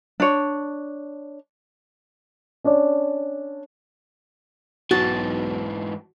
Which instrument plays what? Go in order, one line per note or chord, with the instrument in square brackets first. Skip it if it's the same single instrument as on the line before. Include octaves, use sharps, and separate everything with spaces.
[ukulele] D4 C#5
[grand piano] C#4 D4 C#5 D5
[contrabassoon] B1 [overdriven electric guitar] G#2 E3 [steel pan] F#4 [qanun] A5